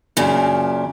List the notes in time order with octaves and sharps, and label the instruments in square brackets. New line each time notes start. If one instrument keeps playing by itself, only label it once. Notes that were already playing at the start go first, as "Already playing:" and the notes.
[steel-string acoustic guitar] F#2 A#2 C#3 D4